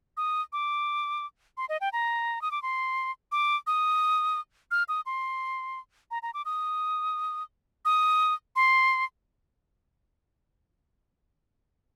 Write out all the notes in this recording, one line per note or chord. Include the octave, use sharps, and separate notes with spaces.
D#6
D6
C6
D#5
G5
A#5
D#6
D6
C6
D6
D#6
F6
D#6
C6
A#5
A#5
D6
D#6
D#6
C6